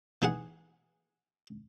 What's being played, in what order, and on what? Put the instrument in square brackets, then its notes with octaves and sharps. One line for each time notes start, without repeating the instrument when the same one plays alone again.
[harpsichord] E3 D#4 G#4 F#5